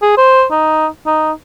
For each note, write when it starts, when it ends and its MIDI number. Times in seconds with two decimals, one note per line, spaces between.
0.02 0.15 68
0.17 0.45 72
0.52 0.87 63
1.06 1.32 63